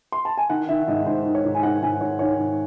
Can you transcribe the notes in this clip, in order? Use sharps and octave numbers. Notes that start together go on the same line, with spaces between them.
C6
A5
G#5
D#3 F#5
D#3 E5
G#2 D#5
G#2 C5
D#3
C#5
G#2
G#5
D#3 F#5
G#2 G#5
G#2 C#5
D#3 C#5
G#2